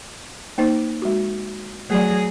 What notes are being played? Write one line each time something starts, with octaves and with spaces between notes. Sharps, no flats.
A#3 D#4 C5
G#3 F#4
F#3 A3 G#4 D5